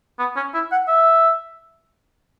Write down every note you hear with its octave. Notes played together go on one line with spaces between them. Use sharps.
B3
C#4
E4
F#5
E5